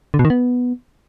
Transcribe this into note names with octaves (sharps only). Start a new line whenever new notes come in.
D3
B2
D#3
B3